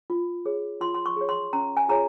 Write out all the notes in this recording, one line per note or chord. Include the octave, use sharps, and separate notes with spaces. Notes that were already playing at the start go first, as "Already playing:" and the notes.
F4
G#4 C#5
F4 C6
C6
C#6
G#4 C#5
C6
C#4 A#5
G#5
F4 G#4 C#5 A#5